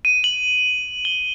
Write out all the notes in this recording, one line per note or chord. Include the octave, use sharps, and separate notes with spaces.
D#7
F#7
G7